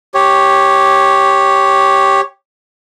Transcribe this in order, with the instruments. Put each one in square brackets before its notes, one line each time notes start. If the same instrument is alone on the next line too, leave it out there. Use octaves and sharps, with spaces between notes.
[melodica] G4 C#5